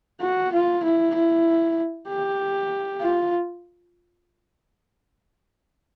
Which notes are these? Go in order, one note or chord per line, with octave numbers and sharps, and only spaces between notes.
F#4
F4
E4
E4
G4
F4